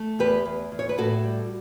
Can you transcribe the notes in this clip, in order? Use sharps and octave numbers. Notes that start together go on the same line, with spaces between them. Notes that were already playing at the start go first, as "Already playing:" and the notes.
Already playing: A3
E2 G4 B4
E2
E2
C#5
B4
A2 F#4 A4
G3